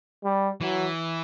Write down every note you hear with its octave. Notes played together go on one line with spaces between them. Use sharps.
G3
E3 F#3